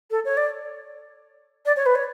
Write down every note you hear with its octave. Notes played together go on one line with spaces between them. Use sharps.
A4
C#5
D5
D5
C#5
B4
C#5